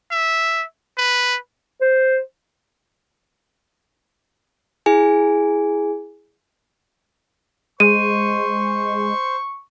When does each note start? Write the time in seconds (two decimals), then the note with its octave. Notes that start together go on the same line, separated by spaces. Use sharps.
0.11 E5
0.97 B4
1.81 C5
4.86 E4 G#4 G#5
7.80 G#3 C5 C#6 D#7